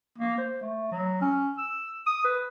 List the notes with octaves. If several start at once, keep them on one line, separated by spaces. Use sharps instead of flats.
A#3
C5
A3
F#3
C#4
E6
D#6
B4